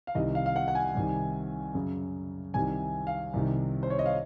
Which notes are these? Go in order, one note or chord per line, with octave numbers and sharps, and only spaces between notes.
F5
C2 C3 D#3 D#5
F5
F5
F#5
F#5
G#5
C2 C3 D#3
F#2 C#3
C2 C3 D#3 G#5
F5
C2 C3 D#3
C5
C#5
D#5
F5